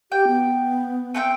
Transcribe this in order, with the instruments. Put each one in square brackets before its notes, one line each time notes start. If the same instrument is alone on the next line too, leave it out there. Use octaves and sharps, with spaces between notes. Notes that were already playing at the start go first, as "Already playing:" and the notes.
[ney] G4 [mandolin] G5
[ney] B3
[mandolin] A3 C4 G5